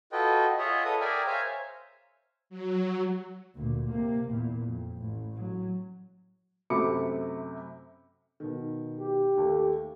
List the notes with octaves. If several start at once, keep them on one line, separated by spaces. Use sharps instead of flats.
F4 F#4 A4 B4 D#5 G5
F4 G#4 C#5 D#5 E5 F#5
A4 B4 D#6
G#4 A#4 D5 E5 G5 G#5
C5 C#5 E5 F5 G#5 A#5
F#3
D2 A#2
C3 A#3
E2 A#2
F2
A1
F#3
F#2 C3 A3 B5 D6 C#7
B2 D#3
G4
D#2 A3